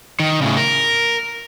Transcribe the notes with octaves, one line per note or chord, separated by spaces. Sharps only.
D#3
A2 C#3
A#4